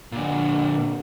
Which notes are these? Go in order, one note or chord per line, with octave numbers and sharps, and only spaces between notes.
A#2 D3